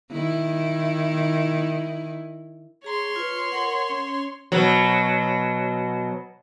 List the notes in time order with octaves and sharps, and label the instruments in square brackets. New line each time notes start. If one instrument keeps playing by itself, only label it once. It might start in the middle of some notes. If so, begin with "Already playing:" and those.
[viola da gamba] D#3 E4
[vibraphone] G#4 A#5 [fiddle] C#5 C6
[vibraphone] F4 B4
A#4 F#5
C#4
[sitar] B2 F#3